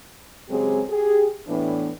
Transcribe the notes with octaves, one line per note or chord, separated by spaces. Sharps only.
C#3 F#3 G#3 C4 G4 G#4
G4 G#4
A2 E3 B3 D4